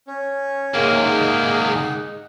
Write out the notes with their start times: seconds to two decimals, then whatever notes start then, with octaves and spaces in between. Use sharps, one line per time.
0.07 C#4
0.74 G#2 C3 A#3 G#4
1.04 D#4 G#4 F#5